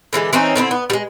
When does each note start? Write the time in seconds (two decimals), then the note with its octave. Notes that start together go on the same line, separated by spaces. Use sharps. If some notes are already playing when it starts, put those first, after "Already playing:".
0.13 D3 E3 G#3 D4
0.33 E3 C4 C#4 D#4
0.56 D3 C4 D#4 E4
0.71 B3
0.90 G3 G#3